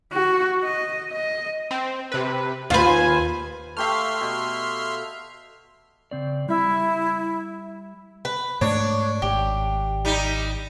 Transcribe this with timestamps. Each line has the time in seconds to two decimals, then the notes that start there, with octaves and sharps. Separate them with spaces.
0.13 F#4
0.63 D#5
1.11 D#5
1.71 C4
2.12 C3 B4
2.70 D#2 F4 B4 C5 G#5
3.77 A3 G4 E5 F5 C6 F6
4.21 B2
6.11 C#3 C4 D5
6.49 G3 E4 E5
8.25 B4
8.61 G#2 A3 D4 C#5
9.22 G#1 G4
10.05 G3 D#4